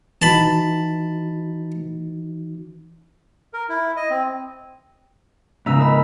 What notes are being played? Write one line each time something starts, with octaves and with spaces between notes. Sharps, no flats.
E3 D#4 F#4 A5 B5
A#4
E4
D#5
C4
G#2 C#3 E5 A#5 E6
A#4 D#5 B5